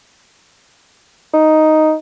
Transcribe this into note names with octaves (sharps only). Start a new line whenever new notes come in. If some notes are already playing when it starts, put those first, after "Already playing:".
D#4